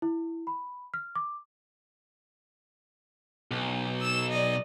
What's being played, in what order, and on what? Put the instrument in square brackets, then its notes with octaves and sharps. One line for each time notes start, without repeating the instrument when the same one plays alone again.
[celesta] E4
B5
F6
D6
[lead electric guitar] B1
[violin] E6 E7
D5 D#5